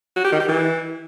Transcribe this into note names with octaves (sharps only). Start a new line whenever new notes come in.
F#4
G4
D#3
G4
E3